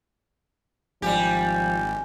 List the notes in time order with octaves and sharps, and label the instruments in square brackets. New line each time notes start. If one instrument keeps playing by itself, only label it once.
[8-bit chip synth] G#1 [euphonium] F3 [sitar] G3 G4 [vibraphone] G#5